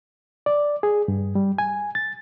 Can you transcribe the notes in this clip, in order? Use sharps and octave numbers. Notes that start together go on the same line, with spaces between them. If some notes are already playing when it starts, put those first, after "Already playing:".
D5
G#4
G2
G3
G#5
A6